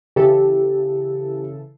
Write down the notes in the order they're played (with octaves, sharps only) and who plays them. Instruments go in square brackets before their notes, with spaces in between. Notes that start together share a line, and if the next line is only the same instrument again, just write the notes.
[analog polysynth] C#3 E3 A4 [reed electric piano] G4